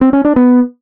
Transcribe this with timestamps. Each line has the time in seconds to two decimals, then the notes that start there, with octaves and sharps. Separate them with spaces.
0.01 C4
0.13 C#4
0.25 D4
0.36 B3